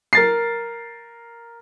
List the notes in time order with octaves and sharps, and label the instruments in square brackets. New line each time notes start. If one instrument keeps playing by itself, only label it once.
[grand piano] A#4 A6 C7